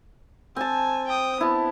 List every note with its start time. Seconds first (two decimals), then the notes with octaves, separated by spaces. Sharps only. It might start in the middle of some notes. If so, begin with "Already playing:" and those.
0.56 C4 G#5 A5
1.07 G5 D#6
1.41 B3 E4 A5